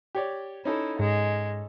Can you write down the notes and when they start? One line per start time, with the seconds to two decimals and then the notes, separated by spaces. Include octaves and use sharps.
0.15 G4 C#5 D5
0.65 C#4 D#4 E4 A4
0.99 G#2 G#3